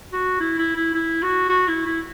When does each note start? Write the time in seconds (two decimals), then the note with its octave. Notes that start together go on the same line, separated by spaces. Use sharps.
0.13 F#4
0.40 E4
0.58 E4
0.76 E4
0.94 E4
1.22 F#4
1.49 F#4
1.68 E4
1.86 E4